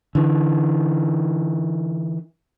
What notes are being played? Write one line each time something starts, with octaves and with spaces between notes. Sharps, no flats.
D3 E3